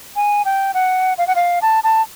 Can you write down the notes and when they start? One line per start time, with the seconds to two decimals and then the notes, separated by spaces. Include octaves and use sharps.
0.16 G#5
0.45 G5
0.74 F#5
1.18 F5
1.27 F#5
1.35 F5
1.62 A5
1.84 A5